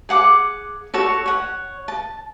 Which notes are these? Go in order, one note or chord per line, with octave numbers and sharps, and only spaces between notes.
G#4 F#5 D6
F#4 A4 C#5
C#5 F#5
A5